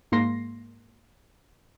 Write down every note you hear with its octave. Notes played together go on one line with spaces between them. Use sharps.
G#2 A#3 C6 A#6 C7